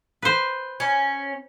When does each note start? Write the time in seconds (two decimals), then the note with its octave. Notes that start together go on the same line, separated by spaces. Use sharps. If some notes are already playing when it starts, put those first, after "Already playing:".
0.22 B4 C5
0.80 C#4